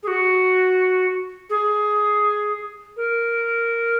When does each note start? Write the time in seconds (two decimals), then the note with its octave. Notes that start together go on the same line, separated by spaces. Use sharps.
0.03 G#4
0.07 F#4
1.49 G#4
2.96 A#4